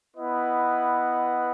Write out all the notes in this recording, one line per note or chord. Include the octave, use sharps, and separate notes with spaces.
B3 E4 B4 D#5 F#5